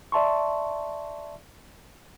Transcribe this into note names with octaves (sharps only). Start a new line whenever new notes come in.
D5 E5 A5 C6 C#6